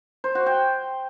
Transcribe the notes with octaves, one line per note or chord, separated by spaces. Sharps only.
C5
F#4
G5